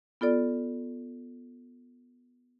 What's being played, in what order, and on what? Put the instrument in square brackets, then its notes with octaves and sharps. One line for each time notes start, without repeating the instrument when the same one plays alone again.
[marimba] B3 F4 A4 D5